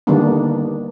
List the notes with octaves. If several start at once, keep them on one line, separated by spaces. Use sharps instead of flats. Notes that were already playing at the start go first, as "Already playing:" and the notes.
D3 D#3 G3 A#3 B3 D4